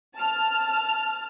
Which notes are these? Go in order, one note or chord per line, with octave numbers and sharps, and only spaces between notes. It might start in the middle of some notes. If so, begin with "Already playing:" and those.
A5 F6